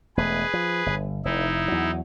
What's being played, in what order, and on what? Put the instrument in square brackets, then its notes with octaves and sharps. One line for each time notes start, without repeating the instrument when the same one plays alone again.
[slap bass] E1 A3 [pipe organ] G#4 B4
[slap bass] F3
G1
[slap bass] F1 [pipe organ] D#4 E4
[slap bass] E2 F#3